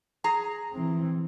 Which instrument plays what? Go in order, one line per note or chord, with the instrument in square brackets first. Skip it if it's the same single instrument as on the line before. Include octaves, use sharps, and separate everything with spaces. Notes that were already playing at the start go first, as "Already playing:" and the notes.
[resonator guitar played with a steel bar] G#4 A#5
[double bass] E3 C4